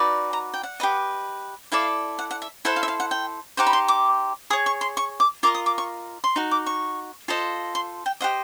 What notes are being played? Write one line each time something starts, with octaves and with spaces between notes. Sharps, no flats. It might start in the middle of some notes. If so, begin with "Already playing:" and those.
Already playing: D#4 F#4 B4 D5
A#5
G5
F#5
G4 B4 D#5
E4 A4 D5 F5
F#5
F#5
E5
E4 A4 C5 F#5
F5
E5
F5
F#5
G5
D#4 G4 C5 F#5
B5
C6
D6
G#4 C#5 D#6
C#6
C6
C#6
D6
F4 A#4 D#5 D6
D#6
D6
C#6
C6
D#4 F#4
D6
C#6
F4 A4 C5 D#5
C6
G5
G4 C5 D#5 F#5